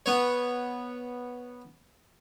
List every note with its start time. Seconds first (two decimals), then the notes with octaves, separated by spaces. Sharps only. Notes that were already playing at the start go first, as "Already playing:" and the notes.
0.06 B3 C#5